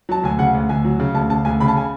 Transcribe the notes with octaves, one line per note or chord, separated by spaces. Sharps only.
F#3 A5
D2 G#5
C#3 F#5
D2
D2 G#5
F#3
C#3
D2 A5
C#3 A5
D2 G#5
C#3 B5
A5
G#5